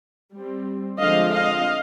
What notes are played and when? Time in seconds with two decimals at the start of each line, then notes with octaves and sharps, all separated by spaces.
0.33 G3
0.38 C4
0.99 D3 F3 G#3 C4 D#5 F5
1.32 D#5 F5